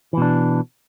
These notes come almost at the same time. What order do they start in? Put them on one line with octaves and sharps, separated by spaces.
E3 B2 D4